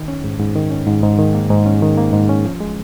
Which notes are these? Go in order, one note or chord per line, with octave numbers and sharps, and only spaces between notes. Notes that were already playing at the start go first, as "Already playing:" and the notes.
Already playing: D#3
C#4
G#2
G#2
D#3
C#4
G#2
G#2
D#3
A#3
G#2
C#4
D#3
A#3
G#2
C#4
F3
G#3